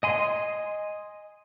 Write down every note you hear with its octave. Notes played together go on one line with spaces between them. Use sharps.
D#5 G#5 C6